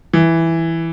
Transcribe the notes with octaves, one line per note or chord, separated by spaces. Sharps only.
E3